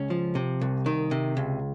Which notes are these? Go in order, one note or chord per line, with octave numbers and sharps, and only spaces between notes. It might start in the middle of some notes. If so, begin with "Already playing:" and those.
Already playing: C#2 C#4
F3
C3
C2
D#3
C3
C#2